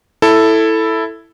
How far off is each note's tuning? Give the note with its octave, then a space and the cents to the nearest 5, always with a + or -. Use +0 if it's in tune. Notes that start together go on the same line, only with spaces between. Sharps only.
E4 +0 A4 +5